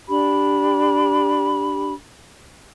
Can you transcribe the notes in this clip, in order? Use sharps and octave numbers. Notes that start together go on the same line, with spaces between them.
D4 G4 B5